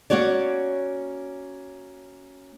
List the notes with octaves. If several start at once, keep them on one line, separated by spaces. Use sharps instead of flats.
A#3 C#4 F#4 C#5 D5